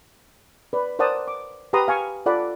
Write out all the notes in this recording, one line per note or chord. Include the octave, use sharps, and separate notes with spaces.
B4 D5
A#4 C5 D5 F#5 A5 D#6
D6
G4 B4 F#5 A#5 C6 D#6
F5 G#5 C#6
F4 A4 D5 F#5 B5